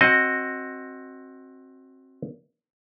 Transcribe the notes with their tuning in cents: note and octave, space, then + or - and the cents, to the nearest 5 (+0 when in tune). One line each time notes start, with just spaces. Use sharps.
C4 +20 F#4 +0 D#5 +0